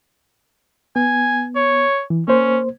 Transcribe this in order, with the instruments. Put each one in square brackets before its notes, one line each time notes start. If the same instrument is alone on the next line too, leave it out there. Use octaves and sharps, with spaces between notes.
[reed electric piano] B3 [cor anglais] G#5
[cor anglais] C#5
[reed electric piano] E3
[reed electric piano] A#3 C5 [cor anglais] C#4